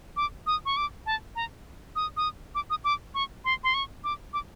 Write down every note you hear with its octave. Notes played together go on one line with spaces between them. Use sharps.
D6
D#6
C#6
D6
A5
A#5
D#6
D#6
D6
D#6
D6
C#6
C6
C6
C#6
D6
D6